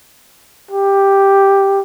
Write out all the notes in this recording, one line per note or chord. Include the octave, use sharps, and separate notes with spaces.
G4